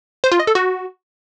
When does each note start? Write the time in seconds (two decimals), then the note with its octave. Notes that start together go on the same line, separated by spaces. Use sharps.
0.24 C5
0.32 F4
0.39 D#5
0.47 A4
0.55 F#4